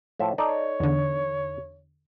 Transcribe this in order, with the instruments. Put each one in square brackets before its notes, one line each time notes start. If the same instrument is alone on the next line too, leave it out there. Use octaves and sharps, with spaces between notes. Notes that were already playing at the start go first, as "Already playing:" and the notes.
[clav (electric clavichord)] A2 F3 E5
[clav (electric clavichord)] D#4 A4 D5 [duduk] C#5
[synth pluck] E2 D3